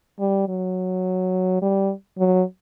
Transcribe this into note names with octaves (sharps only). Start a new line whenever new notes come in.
G3
F#3
G3
F#3